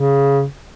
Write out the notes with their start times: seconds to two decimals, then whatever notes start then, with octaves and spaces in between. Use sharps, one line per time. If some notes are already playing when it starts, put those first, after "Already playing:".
Already playing: C#3